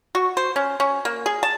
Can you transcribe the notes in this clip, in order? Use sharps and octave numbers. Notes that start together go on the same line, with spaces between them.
F#4
C5
C#4
C#4
A#3
G#4
A5